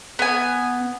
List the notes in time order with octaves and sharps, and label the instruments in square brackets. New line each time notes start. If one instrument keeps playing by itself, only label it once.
[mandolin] B3 G#5